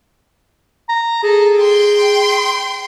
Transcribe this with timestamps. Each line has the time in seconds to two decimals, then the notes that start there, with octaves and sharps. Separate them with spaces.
0.89 A#5
1.23 G#4 A4
1.59 G5 C6